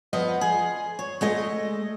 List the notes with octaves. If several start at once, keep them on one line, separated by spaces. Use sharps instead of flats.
F3 B3 D#5
G#4
C#5
G#3 A3 D#5